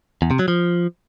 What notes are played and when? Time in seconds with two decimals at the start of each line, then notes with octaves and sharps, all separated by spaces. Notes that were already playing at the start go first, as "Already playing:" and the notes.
0.22 E2
0.31 C3
0.39 F#3
0.48 F3